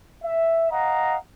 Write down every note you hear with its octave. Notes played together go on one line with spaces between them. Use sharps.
E5
D#5 F5 F#5 A#5